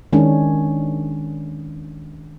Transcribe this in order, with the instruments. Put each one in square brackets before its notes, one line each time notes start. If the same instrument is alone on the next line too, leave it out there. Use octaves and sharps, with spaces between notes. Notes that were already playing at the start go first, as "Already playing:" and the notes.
[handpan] D#3 G#3 C#4 D4